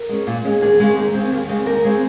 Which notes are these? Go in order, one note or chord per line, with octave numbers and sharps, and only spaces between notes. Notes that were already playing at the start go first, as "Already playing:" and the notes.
Already playing: A#4
G#3 C#4
A#2
G#3 C#4
D#2 G#4
C#3 G#3 C4
D#2
C#3 G#3 C4
D#2
C#3 G#3 C4
D#2 A#4
C#3 G#3 C4